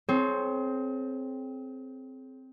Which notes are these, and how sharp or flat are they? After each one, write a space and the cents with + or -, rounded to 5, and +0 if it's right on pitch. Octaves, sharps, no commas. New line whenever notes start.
C4 +0 G#4 +40 C#5 +0